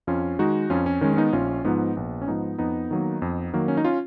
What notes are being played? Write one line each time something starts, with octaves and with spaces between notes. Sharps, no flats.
F2 C#4 F4
D#3 G#3 D#4 F#4
F2 C#4 F4
C#4
D#3 G#3 C#4
C#4
B3 D#4
A#1 C#4 F4
G#2 F3 B3 D#4
A#1 B3
C#4
G#2 F3 B3 D#4
F2 B3 D#4
D#3 F#3 A#3
F2
D#3 F#3 A#3
C#4
D#4
C#4 F4